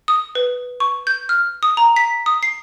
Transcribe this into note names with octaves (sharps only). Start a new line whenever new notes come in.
D#6
B4
C#6
G6
F6
D#6
A#5
B6
D#6
C7